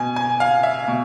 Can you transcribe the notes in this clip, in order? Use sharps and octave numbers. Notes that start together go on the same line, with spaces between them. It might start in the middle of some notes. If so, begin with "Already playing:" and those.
Already playing: B2 G#5
G#5
F5
E5
B2